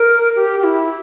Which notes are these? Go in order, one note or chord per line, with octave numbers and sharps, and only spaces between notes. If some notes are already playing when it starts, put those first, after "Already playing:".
Already playing: A#4
G4
G4
E4